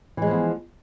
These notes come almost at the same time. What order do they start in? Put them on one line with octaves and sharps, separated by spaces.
E3 G#3 F3 B3